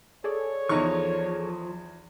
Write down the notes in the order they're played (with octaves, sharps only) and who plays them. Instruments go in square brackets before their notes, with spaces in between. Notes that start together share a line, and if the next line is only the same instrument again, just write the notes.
[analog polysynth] G#4 A4 D5 [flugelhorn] C#5
[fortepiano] E2 D#4 C#6 [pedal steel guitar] F3